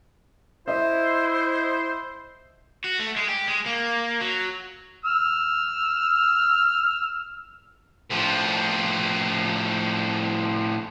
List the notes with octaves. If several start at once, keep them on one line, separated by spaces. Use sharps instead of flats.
E4 C5 D#5 E5
F#4
A3
G#3
G4
G#3
A#3
F#3
E6 F6
A2 F3